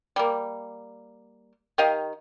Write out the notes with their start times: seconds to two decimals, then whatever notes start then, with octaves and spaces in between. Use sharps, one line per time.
0.16 G3 A#3
1.78 D#3 G4 D#5 F5